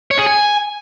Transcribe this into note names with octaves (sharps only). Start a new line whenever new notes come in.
C#5
G#4
G#5